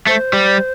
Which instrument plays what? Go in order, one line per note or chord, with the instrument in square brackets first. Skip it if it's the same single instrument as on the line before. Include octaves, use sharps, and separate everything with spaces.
[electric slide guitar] A3 [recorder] C5
[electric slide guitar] G3